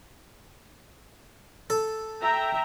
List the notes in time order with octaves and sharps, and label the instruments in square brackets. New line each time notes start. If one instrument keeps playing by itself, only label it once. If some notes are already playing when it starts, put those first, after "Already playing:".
[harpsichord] A4
[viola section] E5 G5 A#5